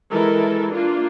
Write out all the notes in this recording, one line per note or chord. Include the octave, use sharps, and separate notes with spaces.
E3 G#3 E4 A4 A#4
A#3 D4 F4